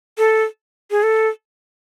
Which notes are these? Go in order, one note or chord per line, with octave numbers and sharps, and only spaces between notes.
A4
G#4
A4